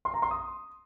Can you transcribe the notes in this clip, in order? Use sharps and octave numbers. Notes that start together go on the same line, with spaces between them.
C6
A#5
C6
D#6